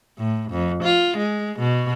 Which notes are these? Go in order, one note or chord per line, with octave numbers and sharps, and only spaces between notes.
A2
F2
F4
G#3
B2